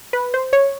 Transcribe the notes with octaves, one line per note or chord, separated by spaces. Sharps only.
B4
C5
C#5